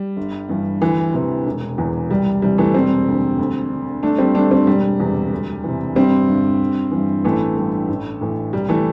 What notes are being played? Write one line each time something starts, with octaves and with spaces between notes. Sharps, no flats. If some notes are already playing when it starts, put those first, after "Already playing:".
Already playing: G3
G1
G2 E3
D2 E3
C3 E3
E1
E2 E3
C2 G3
C3 E3 G3
E3 A3
E1 G3 C4
D2 D3
D2
D3
G1 A3 D4
G3 C4
G2 D3 A3 D4
G3 C4
E1 G3
E2 C3
D2
C3 E3
G1 G3 C4
G2 D3
G1
G2 E3
A1 E3 A3
G2 E3
A1
A2 E3
C2 G3
E3 A3